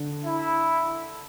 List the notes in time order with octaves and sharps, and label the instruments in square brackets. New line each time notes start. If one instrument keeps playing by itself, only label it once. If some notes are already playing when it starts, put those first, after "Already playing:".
Already playing: [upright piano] D3
[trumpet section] E4